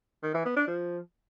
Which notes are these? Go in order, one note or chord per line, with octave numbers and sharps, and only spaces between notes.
D#3
E3
B3
D4
F3